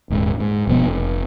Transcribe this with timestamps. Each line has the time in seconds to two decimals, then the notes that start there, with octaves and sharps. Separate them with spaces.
0.10 D#1 G#2
0.40 G#2
0.67 E1 B2 F3 B3
0.86 F1